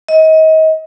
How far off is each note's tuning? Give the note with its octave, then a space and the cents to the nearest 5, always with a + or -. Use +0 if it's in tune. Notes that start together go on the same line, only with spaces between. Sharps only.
D#5 +30